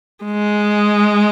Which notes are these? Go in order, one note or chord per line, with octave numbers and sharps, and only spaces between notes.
G#3